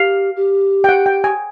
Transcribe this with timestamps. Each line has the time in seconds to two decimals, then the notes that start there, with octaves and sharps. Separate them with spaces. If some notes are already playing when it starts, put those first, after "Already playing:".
Already playing: G4 F5
0.36 G4
0.84 G5
0.89 F#5
1.06 G5
1.24 G#5